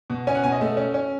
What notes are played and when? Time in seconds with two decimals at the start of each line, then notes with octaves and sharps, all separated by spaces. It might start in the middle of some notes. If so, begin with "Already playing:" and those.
0.10 B2
0.27 C#4 G#5
0.35 F#5
0.44 B2 G#5
0.52 D#5
0.61 A3
0.77 C#4
0.94 C#4